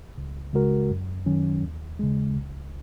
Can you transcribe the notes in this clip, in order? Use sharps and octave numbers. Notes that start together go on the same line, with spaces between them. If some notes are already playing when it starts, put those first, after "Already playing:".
C#2
C#3 G#3 F#4 A#4
F#2
D#3 F#3 C#4
D#2
C#3 G#3
C#2